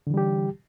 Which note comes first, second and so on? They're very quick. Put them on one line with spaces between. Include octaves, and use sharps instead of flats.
D3 E3 G3 G4